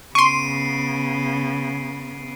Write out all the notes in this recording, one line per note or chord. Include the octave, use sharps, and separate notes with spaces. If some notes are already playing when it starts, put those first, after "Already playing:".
C#3 B3 C6 C#6 C7 D7 D#7